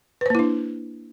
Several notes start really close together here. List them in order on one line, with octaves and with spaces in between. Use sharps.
B4 C5 A#3 E4 D4